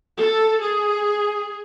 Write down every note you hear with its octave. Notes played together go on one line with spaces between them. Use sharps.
A4
G#4